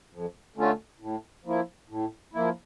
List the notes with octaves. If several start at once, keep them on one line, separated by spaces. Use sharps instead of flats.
F2
D3 A3 C#4 F4
A2
F3 A#3 E4
A2
F3 A#3 E4